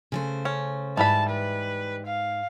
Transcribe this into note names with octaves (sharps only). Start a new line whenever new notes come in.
C#3 A3 C5
C#4
G#2 E3 G3 A5 B5
B4
F5